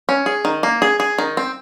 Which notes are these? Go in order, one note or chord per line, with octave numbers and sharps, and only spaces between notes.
C#4
G#4
D#3
A#3
G#4
G#4
D#3
C4